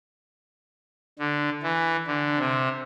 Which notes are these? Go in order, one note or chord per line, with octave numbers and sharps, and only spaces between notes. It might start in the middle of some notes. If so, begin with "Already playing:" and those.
D3
E3
D3
C3